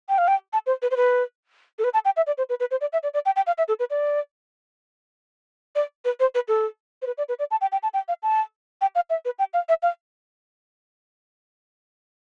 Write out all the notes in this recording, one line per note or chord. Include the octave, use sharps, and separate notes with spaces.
G5
F5
G5
A5
C5
B4
C5
B4
A4
B4
A5
G5
E5
D5
C5
B4
B4
C5
D5
E5
D5
D5
G5
G5
F5
E5
A4
B4
D5
D5
B4
C5
B4
A4
C5
B4
D5
B4
D5
A5
G5
G5
A5
G5
F5
A5
G5
F5
E5
B4
G5
F5
E5
F5